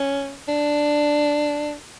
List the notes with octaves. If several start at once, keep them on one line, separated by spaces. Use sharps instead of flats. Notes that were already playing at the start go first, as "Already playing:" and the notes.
Already playing: C#4
D4